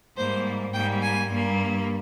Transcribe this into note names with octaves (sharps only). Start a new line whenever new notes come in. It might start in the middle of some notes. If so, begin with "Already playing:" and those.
G#2 G3 A#3 C5
G#2 G3 A#3 G5
G#5
G2 G3 A#3